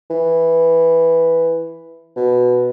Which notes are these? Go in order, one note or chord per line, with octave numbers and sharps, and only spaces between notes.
E3
B2